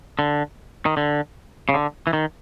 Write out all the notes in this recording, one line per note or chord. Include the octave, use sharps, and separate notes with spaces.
D3
D#3
D3
C#3
D3
E3
D#3